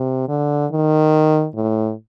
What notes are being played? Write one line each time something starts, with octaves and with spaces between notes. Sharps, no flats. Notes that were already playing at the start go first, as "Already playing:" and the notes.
Already playing: C3
D3
D#3
A2